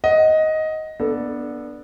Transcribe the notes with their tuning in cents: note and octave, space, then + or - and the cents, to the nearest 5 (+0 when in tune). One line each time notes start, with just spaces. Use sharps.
D#5 +10 F#5 +0
B3 -15 D4 +0 A4 +0